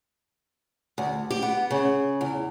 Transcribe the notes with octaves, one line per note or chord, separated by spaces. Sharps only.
D2
G4
B3
C#3
E2